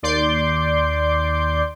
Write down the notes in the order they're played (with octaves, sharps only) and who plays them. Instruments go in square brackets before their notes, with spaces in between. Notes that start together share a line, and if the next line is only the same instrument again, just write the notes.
[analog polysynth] D#2 D5 C6 D6 G6